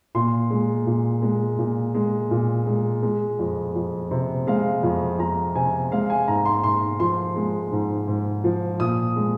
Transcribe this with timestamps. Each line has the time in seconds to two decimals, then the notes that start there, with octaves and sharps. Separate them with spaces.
0.15 A#2 C6
0.50 G#3
0.87 A#2
1.22 G#3
1.59 A#2
1.95 G#3
2.31 A#2
2.67 G#3
3.03 G#3
3.39 F2
3.75 F2
4.11 C3
4.47 G#3 F5
4.83 F2
5.19 F2 A#5
5.56 C3 G#5
5.91 G#3 F5
6.10 G#5
6.28 G#2 A#5
6.45 C6
6.64 G#2 C6
7.00 F3 C6
7.36 G#3
7.72 G#2
8.08 G#2
8.44 F3
8.80 A#2 D#6
9.16 G#3